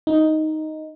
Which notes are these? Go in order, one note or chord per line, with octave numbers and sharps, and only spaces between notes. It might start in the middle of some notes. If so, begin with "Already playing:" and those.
D#4